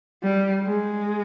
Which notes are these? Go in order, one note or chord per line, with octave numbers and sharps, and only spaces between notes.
G3
G#3